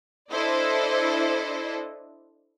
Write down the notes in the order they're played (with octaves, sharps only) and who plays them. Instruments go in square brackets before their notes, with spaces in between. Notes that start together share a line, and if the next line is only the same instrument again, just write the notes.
[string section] D4 E4 A4 C5 D5 D#5